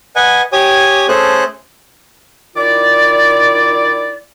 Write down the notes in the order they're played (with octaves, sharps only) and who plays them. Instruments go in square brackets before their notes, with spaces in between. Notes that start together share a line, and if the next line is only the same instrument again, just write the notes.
[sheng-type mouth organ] B4 D#5 F#5 G#5
G4 C#5 G#5 D#6
A3 C#4 G#4 A4 C5 F#6
[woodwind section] D#3 E4 F4 D5